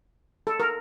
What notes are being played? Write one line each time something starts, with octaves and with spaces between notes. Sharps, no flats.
A4
A#4